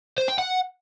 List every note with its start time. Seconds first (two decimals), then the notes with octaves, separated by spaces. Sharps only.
0.18 C5
0.28 G5
0.38 F#5